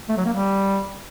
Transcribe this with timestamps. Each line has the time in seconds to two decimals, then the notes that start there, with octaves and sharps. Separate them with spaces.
0.09 A3
0.17 F#3
0.25 A#3
0.34 G3